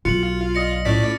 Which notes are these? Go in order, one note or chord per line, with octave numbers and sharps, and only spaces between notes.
B1 F4 F#4 C#7 F#7
D5 D#5 D#6 A#6 C#7
A2 C#4 F4 D5 B6